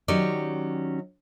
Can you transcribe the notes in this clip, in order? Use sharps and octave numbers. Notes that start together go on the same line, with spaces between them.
D#3 F#3 C#4 G4 D5